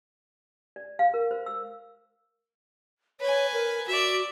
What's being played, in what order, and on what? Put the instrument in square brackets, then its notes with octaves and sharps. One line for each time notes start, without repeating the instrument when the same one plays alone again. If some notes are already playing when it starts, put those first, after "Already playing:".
[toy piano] D5
F5
A#4
C5
E6
[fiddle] B4 G#5 [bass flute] C#5
[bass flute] A#4
[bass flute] F#4 [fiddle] D5 E5